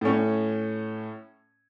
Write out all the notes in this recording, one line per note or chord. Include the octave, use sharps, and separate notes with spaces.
A2 C#4